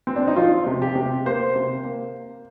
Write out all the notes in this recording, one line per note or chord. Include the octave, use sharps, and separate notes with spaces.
C4
D4
D#4
F3 F4
C3
G4
C3
A#3 C5
C3
A#3